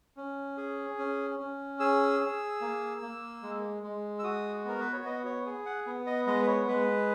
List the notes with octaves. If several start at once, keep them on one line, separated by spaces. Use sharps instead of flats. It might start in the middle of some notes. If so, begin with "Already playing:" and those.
C#4
G#4
C#4
C#4
G#4 E6
G#4
A#3
A#3
G#3
G#3
E6
F#4 D#6
B3 A#4
B4
C#5
B3 D#5
C#5
G#4
F#5
B3
D#5
G#3 D#5
B4
C#5
G#3 B4